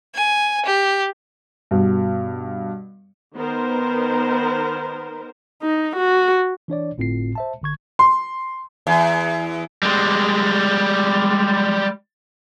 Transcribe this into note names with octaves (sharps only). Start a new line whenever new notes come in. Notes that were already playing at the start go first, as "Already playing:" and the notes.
G#5
G4
G2 B2
D#3 B3 A#4 C5
D#4
F#4
E3 D4 C#5 D5
G1 A2 C4 F4 C7
C5 E5 A5
G1 D3 C#6 G#6
C6
E2
G3 G#3